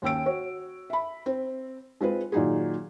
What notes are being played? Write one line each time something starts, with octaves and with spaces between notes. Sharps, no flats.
D#2 C#4 G5 E6 D7
F#4 C#5
E5 B5
C4
G#3 C4 F4 B4
A#2 D#3 F#3 D#4 F#4 G#4